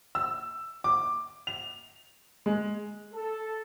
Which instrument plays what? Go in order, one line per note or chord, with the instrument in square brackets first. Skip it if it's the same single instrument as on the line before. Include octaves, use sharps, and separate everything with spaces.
[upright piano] E6
D6
F7
G#3
[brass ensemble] A4